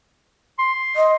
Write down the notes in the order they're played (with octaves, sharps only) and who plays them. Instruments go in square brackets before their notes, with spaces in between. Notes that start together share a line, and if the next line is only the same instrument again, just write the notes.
[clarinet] C6
[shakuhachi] D#5